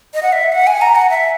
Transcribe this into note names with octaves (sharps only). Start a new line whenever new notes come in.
D#5
F#5
E5
F#5
G#5
A#5
F#5
E5